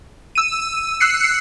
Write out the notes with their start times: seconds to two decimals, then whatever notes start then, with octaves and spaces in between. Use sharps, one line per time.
0.35 E6 D#7
1.00 E6 F#6 C7 C#7